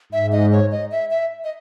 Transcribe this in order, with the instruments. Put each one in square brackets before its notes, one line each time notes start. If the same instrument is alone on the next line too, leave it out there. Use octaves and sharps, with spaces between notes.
[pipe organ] G#2 [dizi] E5
[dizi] D#5
C#5
D#5
E5
E5
D#5